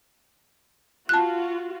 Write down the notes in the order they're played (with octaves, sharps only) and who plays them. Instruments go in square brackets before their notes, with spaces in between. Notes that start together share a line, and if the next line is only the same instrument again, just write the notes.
[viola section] F4 F#4 [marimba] A5 F#6